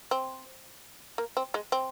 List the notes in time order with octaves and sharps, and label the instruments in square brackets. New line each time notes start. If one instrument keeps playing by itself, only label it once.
[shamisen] C4
A#3
C4
G#3
C4